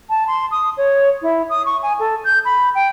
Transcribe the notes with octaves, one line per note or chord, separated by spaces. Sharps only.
A5
C6
D#6
C#5
E4
D#6
C#6
G#5
A4
G6
B5
G5